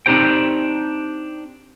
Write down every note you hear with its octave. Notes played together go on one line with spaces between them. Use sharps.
C4 D4 D#4 G4 C5 G5